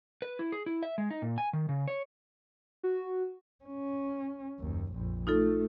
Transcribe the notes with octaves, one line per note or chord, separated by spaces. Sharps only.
B4
E4
G#4
E4
E5
G#3
D#4
A#2
G#5
D#3
C#3
C#5
F#4
C#4
F#1 D#2
A#1 F2
A3 D#4 F4 A4